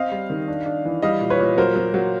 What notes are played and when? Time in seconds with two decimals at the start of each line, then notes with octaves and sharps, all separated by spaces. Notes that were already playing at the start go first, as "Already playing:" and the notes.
Already playing: C4 D#5 F5
0.12 G3
0.30 D#3
0.48 D4
0.66 D4
0.85 E3
1.02 G3 D#5 F5
1.21 A#2
1.30 B4 C#5
1.39 A#2
1.57 F#3 A#4 C5
1.76 F#3
1.94 F#3